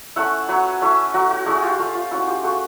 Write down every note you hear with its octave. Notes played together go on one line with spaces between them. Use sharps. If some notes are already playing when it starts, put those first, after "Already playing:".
A3 C#4 E4 E5 F#5
F#3 B4 C#5
A3 C#4 E4
F#3 F#4
F#4
A3 C#4 E4 F#4 G#4
F4 G4
A3 F4
F4
C#4 E4 F#4
F4 G4
A3 F#4 G#4